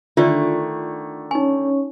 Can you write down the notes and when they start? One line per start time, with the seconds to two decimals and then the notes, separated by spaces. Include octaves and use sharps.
0.17 D3 D#3 A3 F4 D5
1.31 C#4 D#4 C#5 G#5